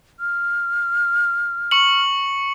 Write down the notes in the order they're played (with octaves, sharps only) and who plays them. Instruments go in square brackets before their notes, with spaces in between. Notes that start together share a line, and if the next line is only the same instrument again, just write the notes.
[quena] F6
[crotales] C#6 C#7 F#7